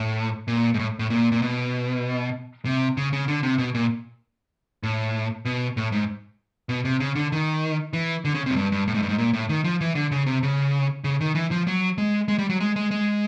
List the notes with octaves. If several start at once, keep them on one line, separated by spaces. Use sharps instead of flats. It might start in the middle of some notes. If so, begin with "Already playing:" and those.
Already playing: A2
A#2
G#2
A2
A2
A#2
A#2
B2
C3
C#3
C#3
D3
C3
B2
A#2
A2
B2
A2
G#2
B2
C3
C#3
D3
D#3
E3
D3
C#3
C3
F#2
G2
G2
A2
G#2
G2
G#2
A#2
A2
D#3
F3
E3
D3
C#3
C3
C#3
C#3
D#3
E3
F3
F#3
G#3
G#3
G3
F#3
G#3
G#3
G#3